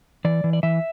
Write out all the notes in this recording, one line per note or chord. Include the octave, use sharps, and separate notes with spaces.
E3 D5
E3
D5
E3 E5